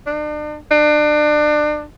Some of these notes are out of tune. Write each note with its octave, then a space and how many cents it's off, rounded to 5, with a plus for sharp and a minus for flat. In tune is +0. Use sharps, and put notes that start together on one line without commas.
D4 +40
D4 +30